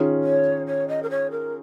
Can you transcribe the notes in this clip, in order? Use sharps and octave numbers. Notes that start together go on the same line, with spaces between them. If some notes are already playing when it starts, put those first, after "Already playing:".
Already playing: D#3 C#4 F4 G#4
C#5
C#5
D#5
A#4
C#5
A#4